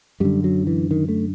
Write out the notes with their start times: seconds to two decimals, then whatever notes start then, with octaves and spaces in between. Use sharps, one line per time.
0.20 F#2 D3 G3
0.44 F#3
0.67 E3
0.91 D#3
1.08 A3